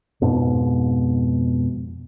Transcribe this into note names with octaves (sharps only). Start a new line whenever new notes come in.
F2 G#2 B2